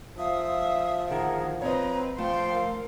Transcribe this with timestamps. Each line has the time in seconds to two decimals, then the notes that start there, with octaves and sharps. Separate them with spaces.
0.17 F3 E5 F5 D#6
1.08 D2 D#3 G#4 A#4 F#5
1.62 C4 B4 C#5 D#5 A#5
2.18 F3 A3 F5 G5 C6
2.55 A#4